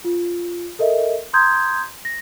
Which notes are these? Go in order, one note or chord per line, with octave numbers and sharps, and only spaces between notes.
F4
A4 A#4 D#5 E5
A#5 C6 D#6 G6 G#6
A#6